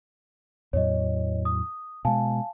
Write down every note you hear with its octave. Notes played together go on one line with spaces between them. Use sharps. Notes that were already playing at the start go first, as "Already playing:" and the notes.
E2 A2 F#3 C#5 D#5
D#6
B2 G#3 F5 G#5 A5